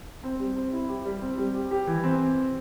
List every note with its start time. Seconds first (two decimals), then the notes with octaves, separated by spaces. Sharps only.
0.24 C4
0.40 G3
0.56 C4
0.73 E4
0.88 G4
1.05 G3
1.22 C4
1.38 G3
1.55 G4
1.71 G4
1.87 E3
2.04 C4